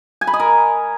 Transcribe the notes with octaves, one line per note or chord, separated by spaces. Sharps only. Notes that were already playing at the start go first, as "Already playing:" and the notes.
G#5
B5
D#5
A#4